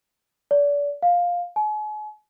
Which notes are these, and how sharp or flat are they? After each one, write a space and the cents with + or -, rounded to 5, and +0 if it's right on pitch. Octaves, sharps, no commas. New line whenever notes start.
D5 -35
F5 +10
G#5 +40